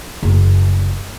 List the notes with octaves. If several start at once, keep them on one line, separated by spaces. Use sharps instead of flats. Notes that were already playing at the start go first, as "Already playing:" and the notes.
F#1